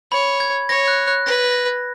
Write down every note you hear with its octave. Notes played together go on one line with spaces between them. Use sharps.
C#5 B5
G#6
C#5 A#6
F#6
F#6
B4 A#6
A#6